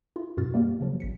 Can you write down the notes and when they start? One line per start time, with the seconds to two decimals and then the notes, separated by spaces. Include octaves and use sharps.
0.16 E4 F4
0.37 F#2 B2 F#4 F6 A6
0.54 G3 A#3 B3 G4
0.81 C#3 F3 F#3
1.00 A1 B6 C#7